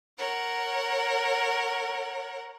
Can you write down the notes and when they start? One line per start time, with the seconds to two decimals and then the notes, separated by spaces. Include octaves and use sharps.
0.18 A#4 C#5 F#5